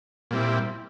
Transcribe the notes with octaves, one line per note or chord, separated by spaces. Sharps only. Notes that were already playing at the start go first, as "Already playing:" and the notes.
A#2 G3 C4 E4